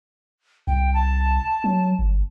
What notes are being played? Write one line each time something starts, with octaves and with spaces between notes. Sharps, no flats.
C2 G5
A5
F#3
G1